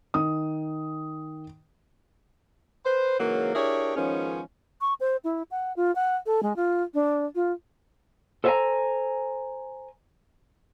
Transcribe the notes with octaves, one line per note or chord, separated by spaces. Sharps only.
D#3 D#6
B4 C5
G#2 C#3 E3 F#3 A#3
D4 E4 G4 G#4 A#4 C#5
G#2 D#3 F3 B3 C#4
C#6
C5
E4
F#5
F4
F#5
A4
G#3
F4
D4
F4
A4 C5 E5 F5 G#5 A#5